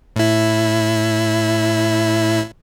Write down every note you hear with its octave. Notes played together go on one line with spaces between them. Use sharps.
A2 E4